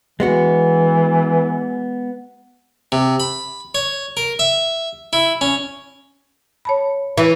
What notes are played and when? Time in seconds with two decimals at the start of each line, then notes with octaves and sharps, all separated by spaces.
0.20 E3 G#3 B3 F#4
2.92 C3
3.20 B5
3.75 C#5
4.17 A#4
4.39 E5
5.13 E4
5.41 C#4
6.65 C#5 A5 B5
7.17 E3